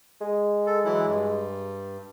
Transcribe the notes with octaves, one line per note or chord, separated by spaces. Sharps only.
G#3
A4
E3 F#3 E4
G2